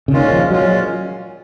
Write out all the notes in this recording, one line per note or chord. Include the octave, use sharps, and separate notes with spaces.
C#3
A#2 D#3 G#3 C#4 F4
F3
A#2 F#3 G#3 C#4 F4